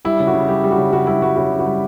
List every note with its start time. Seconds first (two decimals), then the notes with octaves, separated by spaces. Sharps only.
0.05 G3 E4
0.20 C#3
0.27 F#4
0.34 C#3
0.48 G3 G4
0.64 G3
0.71 F#4
0.78 C#3
0.93 C#3 F#4
1.07 G3 E4
1.22 G3 F#4
1.36 C#3 F#4
1.52 C#3
1.59 F#4
1.67 G3